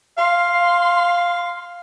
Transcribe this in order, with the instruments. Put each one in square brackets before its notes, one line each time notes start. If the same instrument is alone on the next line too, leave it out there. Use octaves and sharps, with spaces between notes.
[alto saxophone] F5 [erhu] C6